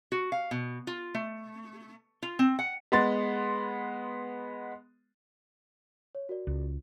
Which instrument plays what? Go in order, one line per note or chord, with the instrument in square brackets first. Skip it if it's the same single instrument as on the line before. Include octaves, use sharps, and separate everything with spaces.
[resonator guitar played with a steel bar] F#4
F5
B2
F4
A3
F4
C4
F#5
[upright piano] G#3 B3 C6 A6
[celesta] C#5
F#4 A#4 D5
[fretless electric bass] C#2